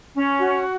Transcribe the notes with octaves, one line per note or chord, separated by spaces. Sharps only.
C#4
F#4